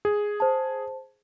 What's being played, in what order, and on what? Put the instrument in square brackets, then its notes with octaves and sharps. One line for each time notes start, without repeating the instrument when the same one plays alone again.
[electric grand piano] G#4
[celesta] C5 A5